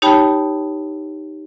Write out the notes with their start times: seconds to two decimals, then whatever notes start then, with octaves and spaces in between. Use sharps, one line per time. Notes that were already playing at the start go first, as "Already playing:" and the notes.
0.02 D#4 G4 C#5 G5 A5 B5